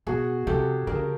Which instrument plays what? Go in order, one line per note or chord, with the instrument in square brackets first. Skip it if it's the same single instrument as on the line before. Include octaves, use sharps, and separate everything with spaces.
[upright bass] B2 [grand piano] F#4 G#4
[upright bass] C3 [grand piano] G4 A4
[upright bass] D3 [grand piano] G#4 A#4
[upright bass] C#3